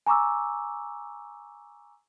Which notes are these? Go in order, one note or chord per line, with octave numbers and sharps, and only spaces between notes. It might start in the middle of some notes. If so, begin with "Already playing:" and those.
G#5 A#5 C#6 D6 E6